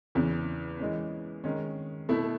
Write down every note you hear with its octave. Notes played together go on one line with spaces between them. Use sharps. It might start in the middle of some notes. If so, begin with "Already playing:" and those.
E2 C#3 E3
E3 G#3 C#4
D#3 G#3 C#4
B2 A3 E4